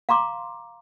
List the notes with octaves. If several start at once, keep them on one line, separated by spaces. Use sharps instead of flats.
F5 A#5 C6 D6